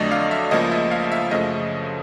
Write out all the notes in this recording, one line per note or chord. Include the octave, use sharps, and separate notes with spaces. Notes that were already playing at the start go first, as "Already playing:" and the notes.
Already playing: F2 D3 F#3 A3 D5 D#5
F5
E5
C#2 C#3 F3 A#3 D#5
E5
F5
E5
F#2 C#3 F3 A3 D#5